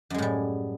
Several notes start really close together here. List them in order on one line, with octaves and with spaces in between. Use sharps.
F#2 G#3 A2 G3